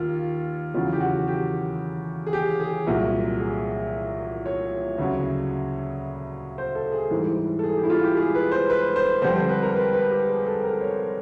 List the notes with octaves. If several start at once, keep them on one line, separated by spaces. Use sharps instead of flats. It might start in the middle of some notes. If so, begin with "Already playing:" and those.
Already playing: D#2 F4
E2 C#3 F#3 F4
G4
F#4
G4
G#4
G4
G#4
C2 A#2 F#3
G#4
C#5
D2 C#3 F#3
C5
A4
G#4
G#2 E3 G3
A4
G#4
G4
E4
F4
G4
G#4
B4
C5
B4
C5
F2 D3 G3 C5
C5
B4
A#4
B4
B4
G4
G#4
A4
A#4
C#5